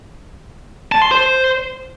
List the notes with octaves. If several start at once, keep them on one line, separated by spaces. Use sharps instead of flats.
A5
C6
C5